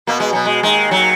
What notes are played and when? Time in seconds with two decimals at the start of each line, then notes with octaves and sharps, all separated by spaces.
0.07 B2 A#3
0.20 G#3
0.33 B2 F#3
0.45 G#3
0.63 D#2 D#3 G#3
0.91 F#3